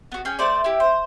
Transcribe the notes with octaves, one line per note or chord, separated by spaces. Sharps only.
B3 F#4
C#4 G#4 G5 G#5
A3 C5 D5
E4 G4
C5